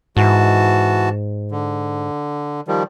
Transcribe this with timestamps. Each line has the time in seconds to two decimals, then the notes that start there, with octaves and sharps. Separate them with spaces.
0.17 G#2 E3 F#4 A5
1.51 D3
2.67 D#3 F3 G3